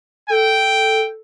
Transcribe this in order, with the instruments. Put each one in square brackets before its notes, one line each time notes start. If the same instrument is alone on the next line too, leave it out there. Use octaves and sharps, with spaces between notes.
[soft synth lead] A4 [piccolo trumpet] G5